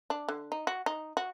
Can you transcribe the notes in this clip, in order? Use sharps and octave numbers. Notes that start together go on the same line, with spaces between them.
D4
D3
D#4
F#4
D#4
F#4